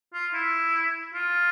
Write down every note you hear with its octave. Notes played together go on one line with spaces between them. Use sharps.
F4
E4
F4